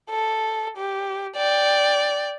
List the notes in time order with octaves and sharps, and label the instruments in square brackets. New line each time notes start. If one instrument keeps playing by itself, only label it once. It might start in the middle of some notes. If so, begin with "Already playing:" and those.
[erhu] A4
G4
[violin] D5 [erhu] G5